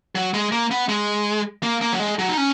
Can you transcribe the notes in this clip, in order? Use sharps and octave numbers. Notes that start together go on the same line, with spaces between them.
F#3
G#3
A#3
B3
G#3
A#3
A#3
F#3
G#3
F#3
D#4
C#4